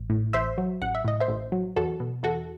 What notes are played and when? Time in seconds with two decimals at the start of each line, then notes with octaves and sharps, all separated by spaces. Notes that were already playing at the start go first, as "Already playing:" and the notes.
Already playing: A1
0.10 A2
0.33 A1 C5 E5
0.58 F#3
0.82 A1 F#5
0.95 E5
1.05 A2 D#5
1.20 C5 E5
1.28 A1
1.52 F#3
1.76 E2 F#4 A4
2.00 B2
2.23 E2 F#4 A4